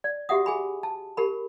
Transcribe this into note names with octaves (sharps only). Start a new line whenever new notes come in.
D5
F#4 G4 E5 F#5 D#6
G#4 G#5 B5
A5
G4 A#4 B5